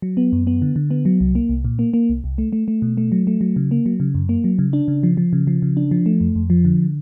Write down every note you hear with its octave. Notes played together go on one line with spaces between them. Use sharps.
F#3
B3
F#2
B3
D3
D3
B3
F#3
C2
A#3
C2
A#2
A#3
A#3
C2
C2
A3
A3
A3
B2
A3
F#3
A3
F#3
C#3
A#3
F#3
C#3
F#2
A#3
F#3
C#3
D4
C#3
F3
F3
C#3
F3
C#3
D4
F3
A3
F2
F2
F3
D3